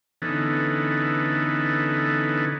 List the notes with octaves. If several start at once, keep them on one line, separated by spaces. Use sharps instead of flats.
D3 E3 B3 C#4 D#4 A4